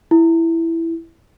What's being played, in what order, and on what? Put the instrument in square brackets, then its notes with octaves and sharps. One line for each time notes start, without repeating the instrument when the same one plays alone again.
[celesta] E4